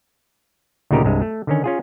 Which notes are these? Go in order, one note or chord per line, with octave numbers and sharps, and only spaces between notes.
D2 A#2 C#3 D#4 G4 A#4
C2 G2 G#3
A3
D3 D#3 C#4
C#4 F4 G#4